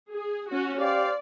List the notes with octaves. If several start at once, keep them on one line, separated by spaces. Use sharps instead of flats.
G#4
C#4 F#4
G4 C5 D5 F5